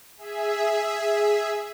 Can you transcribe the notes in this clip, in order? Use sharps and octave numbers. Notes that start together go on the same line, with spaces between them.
G#4 E5